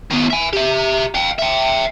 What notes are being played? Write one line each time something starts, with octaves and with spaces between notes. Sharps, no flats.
D#3 B3
E5 G#5
G4 E5
F5 G5
E5 G5